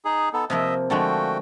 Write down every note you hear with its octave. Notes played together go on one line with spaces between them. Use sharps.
D#4 G#4
B3 D#4 A4
C3 F3 A#3 D#5 E5
D3 F3 G#3 A3 F#4 G5